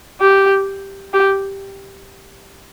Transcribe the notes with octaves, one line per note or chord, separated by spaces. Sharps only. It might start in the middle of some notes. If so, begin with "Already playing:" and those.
G4
G4